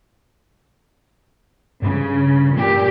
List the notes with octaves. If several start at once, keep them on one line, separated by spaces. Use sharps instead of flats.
G2 C#3
A#2 G4